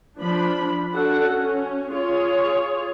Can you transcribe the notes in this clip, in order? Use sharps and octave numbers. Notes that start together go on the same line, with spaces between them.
F3 D4 B5
D4 F#4 A4 F#5
C#4
F4 G#4 C#5